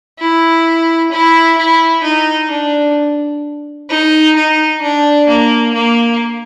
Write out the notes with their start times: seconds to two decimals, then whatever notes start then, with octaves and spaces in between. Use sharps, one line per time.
0.19 E4
1.12 E4
1.58 E4
2.04 D#4
2.51 D4
3.90 D#4
4.36 D#4
4.82 D4
5.28 A#3
5.74 A#3